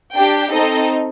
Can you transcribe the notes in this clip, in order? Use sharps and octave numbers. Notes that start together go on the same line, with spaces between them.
D4 G4 G5
C4 D#4 A4 D#5